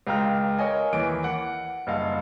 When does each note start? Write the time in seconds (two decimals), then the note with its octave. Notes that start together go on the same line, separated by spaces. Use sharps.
0.07 C#2 F5 G5 A#5 F6
0.59 A#4 C#5 D#5 G#5
0.93 D#2 E3 D7
1.24 F#5
1.87 F#1 G2 D#5 F5